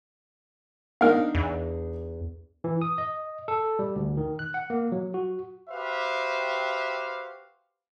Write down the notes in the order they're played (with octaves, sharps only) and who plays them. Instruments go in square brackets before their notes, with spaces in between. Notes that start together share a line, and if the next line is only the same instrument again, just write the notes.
[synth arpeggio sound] B3 A#4 [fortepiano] D4 D#4 F5
[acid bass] E2
[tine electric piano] E3
D#6
D#5
A4
G3
D2
D#3
F#6
F#5
A#3
F#3
F#4
[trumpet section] F#4 G4 B4 C5 E5 F5